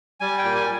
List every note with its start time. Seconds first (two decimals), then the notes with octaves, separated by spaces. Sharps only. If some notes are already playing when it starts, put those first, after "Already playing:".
0.20 G3 G#5
0.38 G5
0.44 A#2
0.55 G#5